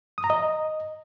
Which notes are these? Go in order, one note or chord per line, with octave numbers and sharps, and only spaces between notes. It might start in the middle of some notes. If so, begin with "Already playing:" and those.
D#6
A#5
D#5